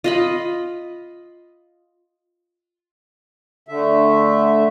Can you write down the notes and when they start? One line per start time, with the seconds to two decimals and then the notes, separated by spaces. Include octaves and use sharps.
0.04 F4 D#5 B5
3.68 D3 A3 E5